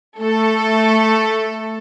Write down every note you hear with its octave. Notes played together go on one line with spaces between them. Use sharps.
A3 A4